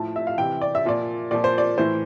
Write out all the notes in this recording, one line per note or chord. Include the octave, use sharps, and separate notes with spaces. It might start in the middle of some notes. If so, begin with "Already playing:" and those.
Already playing: A2 F3 A5
E5
F5
C3 E3 G5
D5
E5
A#2 F3 D5
A#2 F3 D5
C5
D5
A2 E3 C5